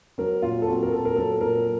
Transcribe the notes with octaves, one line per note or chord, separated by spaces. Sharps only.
F#3 A#4
A#2 F4
A4
C4 F#4
A#4
A#2 A4
A#4
F#3 A4
A#2 A#4